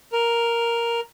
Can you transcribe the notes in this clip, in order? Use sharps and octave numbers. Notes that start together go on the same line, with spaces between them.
A#4